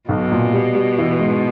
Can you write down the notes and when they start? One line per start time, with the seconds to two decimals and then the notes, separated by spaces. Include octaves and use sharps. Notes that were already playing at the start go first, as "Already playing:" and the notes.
0.09 B1 B2
0.32 A#2
0.53 G3
0.75 G3
0.98 E3
1.19 G#2